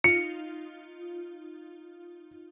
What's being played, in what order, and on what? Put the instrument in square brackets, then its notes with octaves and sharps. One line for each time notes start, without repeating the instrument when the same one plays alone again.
[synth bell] D#4 F4 [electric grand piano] C#7